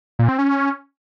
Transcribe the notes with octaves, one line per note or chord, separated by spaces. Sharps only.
A#2
C4
C#4